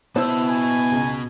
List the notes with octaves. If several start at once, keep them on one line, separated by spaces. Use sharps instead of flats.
B2 B3 E4 C5 A5 E6
G#5
C#2